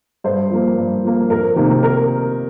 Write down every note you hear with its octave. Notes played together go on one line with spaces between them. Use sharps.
G2 C5
F3 A#3
G2
F3 A#3
F2 A#4
C3 D#3 A#3
A#4